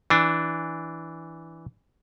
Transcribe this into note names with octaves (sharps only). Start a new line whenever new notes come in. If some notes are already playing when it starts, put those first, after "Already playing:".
E3 D4